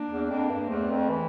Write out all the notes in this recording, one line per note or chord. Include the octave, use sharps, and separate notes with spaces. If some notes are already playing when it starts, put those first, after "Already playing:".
Already playing: A#3 D4
E2
F2 A#3 D4
G2
E2 A3 C4
F2
E3